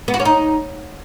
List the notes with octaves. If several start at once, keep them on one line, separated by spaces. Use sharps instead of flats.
B3
F#4
C#4
D#4